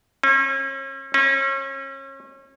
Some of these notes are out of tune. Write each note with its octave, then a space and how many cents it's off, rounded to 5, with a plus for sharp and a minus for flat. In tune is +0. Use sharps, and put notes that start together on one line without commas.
C#4 -40
C#4 -35